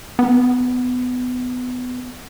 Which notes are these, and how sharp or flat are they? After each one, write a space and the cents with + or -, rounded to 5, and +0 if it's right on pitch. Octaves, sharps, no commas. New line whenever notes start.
B3 +20